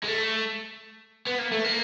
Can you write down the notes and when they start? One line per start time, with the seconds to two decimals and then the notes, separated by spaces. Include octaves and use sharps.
0.03 G#3
0.08 A3
1.27 B3
1.39 A#3
1.52 A3
1.64 A#3